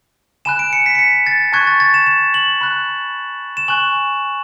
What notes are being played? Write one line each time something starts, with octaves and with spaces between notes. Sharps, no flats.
G#5 B5 F#6 E7
D7
C#7
B6
C#7
B6
A6
A5 C#6 F#6 G#6
A6
A6
E7
E7
F#7
B5 F#6
E7
G#5 C#6 F#6 F#7